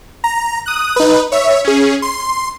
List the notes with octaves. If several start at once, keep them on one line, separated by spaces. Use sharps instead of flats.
A#5
D#6 F#6
D#4 B4
C#5 E5
C#4 G#4
C6